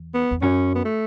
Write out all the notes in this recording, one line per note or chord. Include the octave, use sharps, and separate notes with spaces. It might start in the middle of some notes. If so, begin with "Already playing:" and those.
Already playing: E2
B3
E2
F#2 C#4
B3
A3